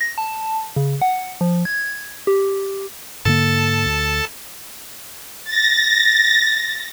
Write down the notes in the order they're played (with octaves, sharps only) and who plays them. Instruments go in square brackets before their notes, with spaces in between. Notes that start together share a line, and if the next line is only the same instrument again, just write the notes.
[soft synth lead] A#6
A5
C#3
F#5
F3
G#6
G4
[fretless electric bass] G#2 D3 A#3 [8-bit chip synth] A4 A5
[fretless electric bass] D2
[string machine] A6 A#6